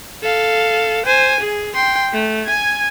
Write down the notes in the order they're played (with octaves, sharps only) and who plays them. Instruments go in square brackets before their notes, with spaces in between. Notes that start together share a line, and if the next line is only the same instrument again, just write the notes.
[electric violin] A4 F5
C5 G#5
G#4
G5 C6
A3
G#5 G#6